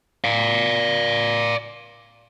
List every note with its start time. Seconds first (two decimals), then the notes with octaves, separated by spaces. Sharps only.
0.24 D5 F5